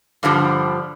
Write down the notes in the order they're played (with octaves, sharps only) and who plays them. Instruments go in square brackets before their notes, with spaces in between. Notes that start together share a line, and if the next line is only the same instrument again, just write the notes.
[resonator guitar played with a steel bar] G2 D3 F3 G3